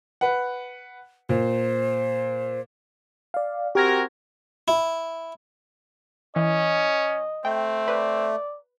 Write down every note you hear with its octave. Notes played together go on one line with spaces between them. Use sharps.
B4 F#5
A#2 C5
D5 F5
C4 F#4 G4 A#4 G#6 A#6
E4
E3 C#4 D#5
A3 C4 G5
B4 D5